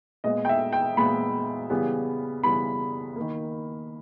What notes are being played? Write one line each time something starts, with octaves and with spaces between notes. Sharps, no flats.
A#2 G#3 B3 D#5
G5
E5
G5
A#2 G#3 B3 B5
C#3 E3 G3 B3
C#3 E3 G3 B3 B5
D#3 A#3